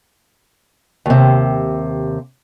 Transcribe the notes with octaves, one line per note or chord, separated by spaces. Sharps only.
D#2 C3